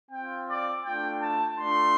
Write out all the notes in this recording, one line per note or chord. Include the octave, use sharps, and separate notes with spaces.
C4 F4 G5
D5
A3 D4 F4 G5
A5
A3 D4 F4 C6